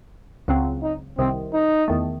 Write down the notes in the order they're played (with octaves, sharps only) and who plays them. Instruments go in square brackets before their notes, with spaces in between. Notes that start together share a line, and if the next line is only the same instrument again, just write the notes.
[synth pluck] C#2 C#3 F#3 C4
[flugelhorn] D#4
[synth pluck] C2 C3 D#3 [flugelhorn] C4
[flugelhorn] D#4
[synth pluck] E2 D#3 A3